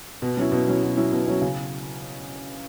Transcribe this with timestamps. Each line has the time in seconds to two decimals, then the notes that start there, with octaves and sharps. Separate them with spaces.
0.22 B2
0.37 F#3 C#4 E4
0.52 B2
0.68 F#3 C#4 E4
0.83 B2
0.97 F#3 C#4 E4
1.12 B2
1.26 F#3 C#4 E4
1.41 C#3